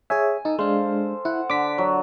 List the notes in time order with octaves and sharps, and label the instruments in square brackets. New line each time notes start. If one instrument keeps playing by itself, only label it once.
[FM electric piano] G#4 C#5 E5 [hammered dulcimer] G#5
[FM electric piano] D#4 [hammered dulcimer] A4
[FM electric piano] G#3 D4 [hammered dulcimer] C5 F5
[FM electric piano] E4 [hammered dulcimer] F#5
[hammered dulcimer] D3 [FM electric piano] D6 B6
[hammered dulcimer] F#3